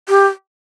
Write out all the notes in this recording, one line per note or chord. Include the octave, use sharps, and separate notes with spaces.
G4